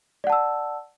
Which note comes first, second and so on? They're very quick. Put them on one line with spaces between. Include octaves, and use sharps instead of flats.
D5 F#5 A5 E6